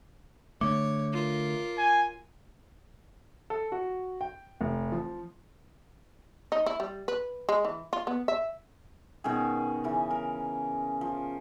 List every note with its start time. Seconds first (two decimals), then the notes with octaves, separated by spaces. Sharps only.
0.61 D3 A3 C#5 D6
1.13 F4 A#4
1.78 G#5
3.50 A4
3.72 F#4
4.21 G5
4.61 F1
4.92 F3
6.52 D#4
6.66 E4
6.80 G3
7.08 B4
7.49 G#3
7.65 E3
7.93 F4
8.07 B3
8.28 E5
9.24 B2 D#3 C#4 G#4
9.84 C#3 E3
10.11 A#4
11.01 F3